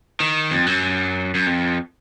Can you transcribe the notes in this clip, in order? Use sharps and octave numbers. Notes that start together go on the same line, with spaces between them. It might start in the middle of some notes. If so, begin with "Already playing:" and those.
D#3
F2
F#2
F#2
F2